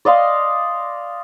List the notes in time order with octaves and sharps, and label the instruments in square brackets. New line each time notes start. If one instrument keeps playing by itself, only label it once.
[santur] D5 D#5 F5 C6